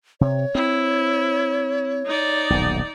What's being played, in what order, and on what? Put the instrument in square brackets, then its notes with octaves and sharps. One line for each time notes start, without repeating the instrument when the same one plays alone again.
[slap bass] C3 [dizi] C#5
[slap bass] C4 [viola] E4
[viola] D#4 D5
[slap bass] D#1 B1